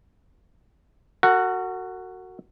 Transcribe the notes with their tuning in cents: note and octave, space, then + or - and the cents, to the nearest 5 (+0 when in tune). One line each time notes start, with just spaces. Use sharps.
F#4 +0 A#4 -45 F#5 +0